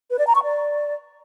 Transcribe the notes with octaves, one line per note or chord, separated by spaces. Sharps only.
B4
D5
A#5
C#6
D5